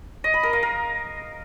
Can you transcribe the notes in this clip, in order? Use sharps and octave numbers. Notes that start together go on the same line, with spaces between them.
D#5
B5
A#4
F5
A#4